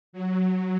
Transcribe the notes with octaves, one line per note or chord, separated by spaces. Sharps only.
F#3